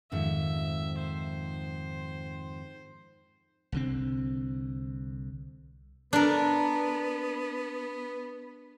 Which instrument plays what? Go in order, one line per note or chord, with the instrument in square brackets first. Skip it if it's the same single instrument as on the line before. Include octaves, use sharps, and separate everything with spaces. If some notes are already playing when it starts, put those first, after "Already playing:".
[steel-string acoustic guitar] F2 G#2 D#3 [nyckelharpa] E5
[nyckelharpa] C5
[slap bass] C2 D3 C4
[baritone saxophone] B3 [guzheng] D4 A#4